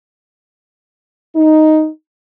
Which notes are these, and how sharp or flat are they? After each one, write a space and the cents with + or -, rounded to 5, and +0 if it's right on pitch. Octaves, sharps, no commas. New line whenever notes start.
D#4 +0